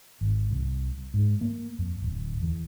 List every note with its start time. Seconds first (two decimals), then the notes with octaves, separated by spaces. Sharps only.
0.21 G#1
0.51 C2
1.14 G#2
1.41 A#3
1.79 F2
2.02 D1
2.42 E2